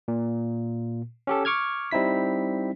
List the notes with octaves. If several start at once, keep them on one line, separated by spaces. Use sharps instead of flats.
A#2
C#4 G4 A4
C#6 D6 F6 G#6
G3 C4 D#4 E4 B6